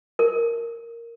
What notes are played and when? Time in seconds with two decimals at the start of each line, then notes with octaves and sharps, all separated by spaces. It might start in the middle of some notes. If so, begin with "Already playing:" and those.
0.19 A#4